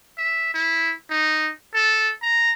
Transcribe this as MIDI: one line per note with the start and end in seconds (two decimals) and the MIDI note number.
0.18 0.52 76
0.54 0.94 64
1.11 1.50 63
1.74 2.10 69
2.22 2.51 82